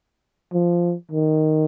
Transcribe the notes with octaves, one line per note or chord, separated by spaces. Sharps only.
F3
D#3